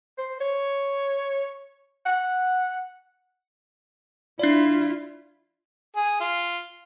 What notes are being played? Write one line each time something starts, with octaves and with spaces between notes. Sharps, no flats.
C5
C#5
F#5
D4 E4 F4 D5
G#4
F4